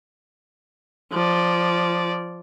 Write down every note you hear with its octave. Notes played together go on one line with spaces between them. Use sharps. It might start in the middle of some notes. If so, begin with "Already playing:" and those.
F3 D5